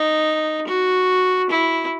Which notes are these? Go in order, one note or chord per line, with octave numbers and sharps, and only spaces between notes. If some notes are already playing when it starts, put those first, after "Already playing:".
Already playing: D#4
F#4
E4